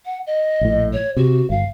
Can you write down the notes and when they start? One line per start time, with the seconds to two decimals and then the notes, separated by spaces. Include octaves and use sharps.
0.05 F#5
0.26 D#5
0.61 A#1 A2
0.93 C#5
1.17 C3 F#4
1.50 G1 F5